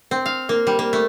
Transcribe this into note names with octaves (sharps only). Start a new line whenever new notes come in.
C4
F5
A#3
G3
A#3
A3